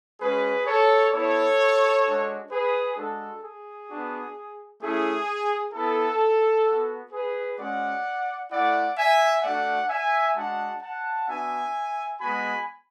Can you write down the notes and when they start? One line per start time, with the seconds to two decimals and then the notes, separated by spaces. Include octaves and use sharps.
0.19 G#3 C#4 F#4 G#4 B4
0.66 A4 C#5
1.12 B3 E4 A4 C#5
2.04 G#3 D4 F#4
2.50 G#4 B4
2.96 G#3 D4 F#4 A4
3.43 G#4
3.89 B3 D4 F#4
4.81 A3 C#4 E4 G#4
5.73 B3 E4 A4
6.66 B3 F#4
7.11 G#4 B4
7.58 G#3 C#4 F#4 D5 F#5
8.50 A3 E4 D5 F#5
8.96 E5 G#5
9.42 A3 D4 F#4 D5 F#5
9.88 E5 G#5
10.35 G#3 D4 F#4 F#5 A5
10.81 F#5 A5
11.27 B3 D4 F#4 E5 G#5
12.19 G#3 B3 F#4 G#5 B5